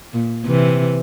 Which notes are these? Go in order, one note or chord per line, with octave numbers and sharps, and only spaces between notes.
A#2
C3 E3